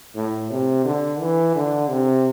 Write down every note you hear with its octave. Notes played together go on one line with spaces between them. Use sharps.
A2
C3
D3
E3
D3
C3